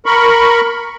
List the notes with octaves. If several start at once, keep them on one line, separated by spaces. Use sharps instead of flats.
A#4 B5 C#6